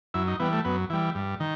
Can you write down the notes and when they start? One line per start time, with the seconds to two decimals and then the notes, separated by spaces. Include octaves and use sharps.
0.14 F#2 E4
0.28 D#4
0.40 E3 G3 B3
0.52 A3
0.65 F#2 B3
0.90 E3 G3
1.15 G2
1.40 D#3